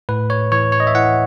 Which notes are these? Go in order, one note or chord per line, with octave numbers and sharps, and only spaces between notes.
A2 B4
C#5
E3 C#5
C#5
D#5
E5
E3 F#5